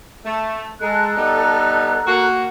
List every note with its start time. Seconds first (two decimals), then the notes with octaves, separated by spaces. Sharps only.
0.25 A3
0.81 G#3 A4 A#5 F#6
1.16 G3 B3 D#4
2.07 A#3 F#4